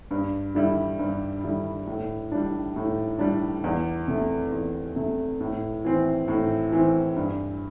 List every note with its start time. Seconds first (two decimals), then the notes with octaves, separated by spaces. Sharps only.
0.11 G2
0.55 D3 G3 E4
0.99 G2
1.43 D3 G3 E4
1.87 A2
2.32 G3 D4
2.76 A2
3.19 G3 D4
3.64 E2
4.08 C3 A3
4.52 E2
4.96 C3 A3
5.41 A2
5.85 E3 C4
6.28 A2
6.72 E3 C4
7.16 G2